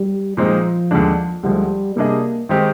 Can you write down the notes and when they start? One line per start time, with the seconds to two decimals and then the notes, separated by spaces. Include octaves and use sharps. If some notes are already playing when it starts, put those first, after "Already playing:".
Already playing: G3
0.37 A#2 F3 G#3 C4 D#4
0.91 D#2 D3 G#3 D4
1.43 D2 D3 F3 G3 G#3
1.96 C3 G3 A#3 D4 G#4 D#5
2.49 D#3 G#3 C4 D#4 G4